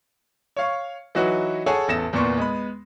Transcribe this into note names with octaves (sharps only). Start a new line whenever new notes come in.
C#5 F5 C#6
E3 F#3 D#4 F#4 B4
G#4 A4 C#5 F#5 G#5 A5
A1 E2 A4 A5 A#6 E7
E2 A#2 B3 D5 C6 C#6
G#3 B3 B5